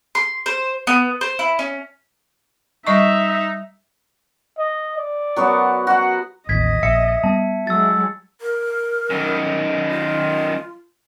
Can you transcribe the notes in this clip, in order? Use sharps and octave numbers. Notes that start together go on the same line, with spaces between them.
C6
C5
B3
C5
E4
C#4
G3 D#4 D#5 E5 C#6
D#5
D5
F#3 B3 F#4
F#4 F#5
A1 D#2 D#5 G#6 B6
A#1 E5 C#7
G3 B3 A5
F#3 G#3 E6 A6
A#4
F#2 D#3
F4